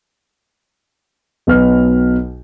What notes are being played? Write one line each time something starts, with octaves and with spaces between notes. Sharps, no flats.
B1 B2 B4 F6